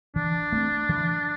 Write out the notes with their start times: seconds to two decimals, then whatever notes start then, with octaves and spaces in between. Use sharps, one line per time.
0.16 E3 D4
0.52 A3 C4
0.89 E3